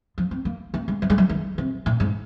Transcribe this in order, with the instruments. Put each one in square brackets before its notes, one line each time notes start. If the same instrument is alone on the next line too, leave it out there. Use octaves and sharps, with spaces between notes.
[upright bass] F3
C4
A#3
A#3
G#3
F#3
G#3
F#3
D#3
C3
A#2
G#2